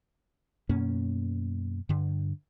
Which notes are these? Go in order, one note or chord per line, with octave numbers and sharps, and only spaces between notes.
F#2 B2 A#3 C#4
G2 D3